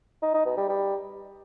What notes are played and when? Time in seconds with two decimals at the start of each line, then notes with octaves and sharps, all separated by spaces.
0.22 D#4
0.34 D#4
0.45 B2
0.57 G3
0.69 G3